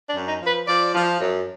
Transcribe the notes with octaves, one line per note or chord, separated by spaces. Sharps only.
D4
F#2
D#4
F3
B4
F3 D5
F3
F#2